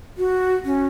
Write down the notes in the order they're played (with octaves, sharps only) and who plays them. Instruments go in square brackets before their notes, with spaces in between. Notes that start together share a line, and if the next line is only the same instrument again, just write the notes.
[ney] F#4
C#4